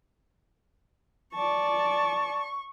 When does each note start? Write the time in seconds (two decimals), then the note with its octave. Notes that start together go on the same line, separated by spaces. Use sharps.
1.35 D5 A5 C#6